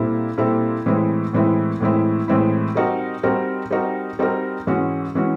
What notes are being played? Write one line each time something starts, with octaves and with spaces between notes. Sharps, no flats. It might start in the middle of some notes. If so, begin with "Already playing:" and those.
Already playing: A#2 G3 C4 E4 A4
A#2 G3 C4 E4 A4
A2 E3 G#3 C4 E4
A2 E3 G#3 C4 E4
A2 E3 G#3 C4 E4
A2 E3 G#3 C4 E4
G3 C4 D#4 F#4 A#4
G3 C4 D#4 F#4 A#4
G3 C4 D#4 F#4 A#4
G3 C4 D#4 F#4 A#4
G#2 E3 G#3 C#4 F#4
E3 G#3 C#4 F#4